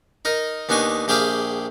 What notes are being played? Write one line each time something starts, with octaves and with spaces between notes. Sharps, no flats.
D#4 A#4 D#5
D#2 B3 D4 D#4 G#5 C#6
A#1 G4 G#4 E5 F5 G5